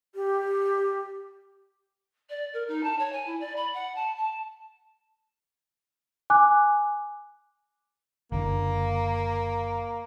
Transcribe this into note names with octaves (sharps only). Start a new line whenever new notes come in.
G4
D5
A#4
D#4
A5
C#5
G#5
E4
D5
B5
F#5
A5
A5
G#5 D6 F#6
F#1 D3 A#3